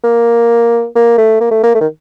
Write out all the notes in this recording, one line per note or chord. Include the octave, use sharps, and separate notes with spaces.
A#3
A#3
A3
A#3
A3
A#3
A3
D#3